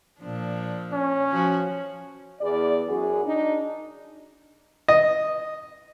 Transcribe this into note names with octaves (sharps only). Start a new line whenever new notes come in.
A#2 F3 D4
C#4
F3 F#4
E2 G#4 D5
F#2 F#4 G#4
D4 D#4
D#5